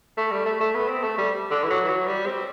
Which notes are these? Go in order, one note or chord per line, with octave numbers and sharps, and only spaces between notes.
A3
G3
A3
A3
B3
C4
A3
G3
D3
E3
F#3
E3
F#3
G3
C4